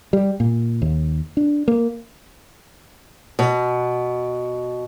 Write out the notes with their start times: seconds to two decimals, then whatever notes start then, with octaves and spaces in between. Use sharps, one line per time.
0.13 G3
0.40 A#2
0.82 D#2
1.37 D4
1.68 A#3
3.39 B2